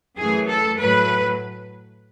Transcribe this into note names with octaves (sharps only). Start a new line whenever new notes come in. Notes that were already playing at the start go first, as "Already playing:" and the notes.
F#2 E3 A3 G#4
A4
A2 F#3 A3 B4